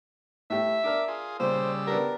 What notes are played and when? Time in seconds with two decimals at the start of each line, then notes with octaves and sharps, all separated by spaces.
0.50 A2 G4 E5
0.84 D4 A#4 D6 F6
1.08 F4 G#4
1.40 A#2 C#3 G3 C5 E6
1.87 B3 D4 G4 A#4